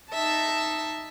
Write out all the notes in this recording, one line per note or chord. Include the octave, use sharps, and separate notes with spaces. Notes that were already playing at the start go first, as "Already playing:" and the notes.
D#4 E5 A5